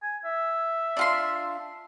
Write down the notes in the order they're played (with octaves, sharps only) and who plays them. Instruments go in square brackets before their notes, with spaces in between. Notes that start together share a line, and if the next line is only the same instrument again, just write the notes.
[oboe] G#5
E5
[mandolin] D4 F4 C6